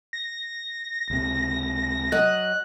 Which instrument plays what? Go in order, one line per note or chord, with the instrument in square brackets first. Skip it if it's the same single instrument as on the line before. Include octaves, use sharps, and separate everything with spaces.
[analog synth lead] A#6
[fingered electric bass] C#2 C3
[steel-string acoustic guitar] F#3 D#5 [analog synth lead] F#6